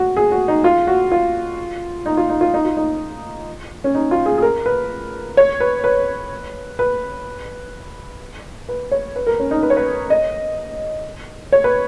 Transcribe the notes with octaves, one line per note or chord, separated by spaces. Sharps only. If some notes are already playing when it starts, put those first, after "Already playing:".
Already playing: F#4
G#4
F#4
D#4
F4
F#4
F4
D#4
F4
D#4
F4
D#4
F4
D#4
C#4
D#4
F4
G#4
G#4
A#4
B4
C#5
B4
B4
B4
B4
C#5
B4
A#4
C#4
D#4
B4
C#5
B4
D#5
C#5
B4